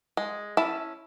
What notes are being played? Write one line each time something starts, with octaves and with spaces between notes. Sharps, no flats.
G#3
C#4 E4 A5